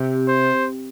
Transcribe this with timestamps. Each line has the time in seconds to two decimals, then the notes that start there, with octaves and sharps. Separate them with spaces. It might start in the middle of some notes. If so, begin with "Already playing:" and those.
Already playing: C3
0.28 C5